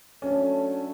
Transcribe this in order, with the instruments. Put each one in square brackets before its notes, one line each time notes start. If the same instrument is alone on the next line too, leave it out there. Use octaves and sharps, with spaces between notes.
[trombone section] F#3 A3 D4 A4 [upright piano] C#4